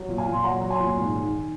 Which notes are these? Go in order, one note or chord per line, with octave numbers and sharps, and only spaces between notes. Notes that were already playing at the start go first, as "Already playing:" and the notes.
Already playing: F#3
A#2
F5 G#5
A#2
C6
F#3 F#5 A#5
F#3
G#5 C6
A#2
G#2
D#3